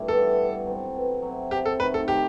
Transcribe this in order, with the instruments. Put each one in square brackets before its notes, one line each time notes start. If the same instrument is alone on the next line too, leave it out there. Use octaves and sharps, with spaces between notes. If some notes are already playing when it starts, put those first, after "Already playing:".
Already playing: [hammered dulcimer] G2 A3 E4
[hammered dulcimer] E3 G3 B3 [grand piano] A4
[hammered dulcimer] G2
F#3 C4
B2
F#3 C4 E4
[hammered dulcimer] C3 [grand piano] G4
[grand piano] A4
[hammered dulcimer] D#3 A3 E4 [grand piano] B4
[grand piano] A4
[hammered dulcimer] D#3 [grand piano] G4